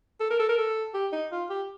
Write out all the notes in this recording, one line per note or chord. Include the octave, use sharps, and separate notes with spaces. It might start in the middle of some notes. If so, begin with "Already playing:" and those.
A4
A#4
A4
A#4
A4
G4
D#4
F4
G4